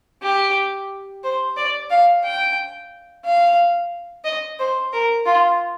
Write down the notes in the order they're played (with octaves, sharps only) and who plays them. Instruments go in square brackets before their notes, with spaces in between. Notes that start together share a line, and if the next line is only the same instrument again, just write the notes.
[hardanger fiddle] G4
C5
D5
F5
G5
F5
D#5
C5
A#4
F4